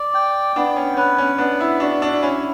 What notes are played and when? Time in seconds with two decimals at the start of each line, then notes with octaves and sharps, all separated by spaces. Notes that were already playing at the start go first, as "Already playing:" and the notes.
Already playing: D5
0.14 G5
0.56 B3 D4
0.76 C#4
0.97 C#4 B4
1.18 C#4
1.38 B3 D4
1.60 E4
1.80 D4 F#4
2.02 D4
2.22 C#4 E4